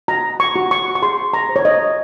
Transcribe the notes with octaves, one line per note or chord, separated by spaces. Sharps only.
F#4 A#5
C#6
F#4
C#6
C#6
G#4 C6
A#5
C5
C#5
D#5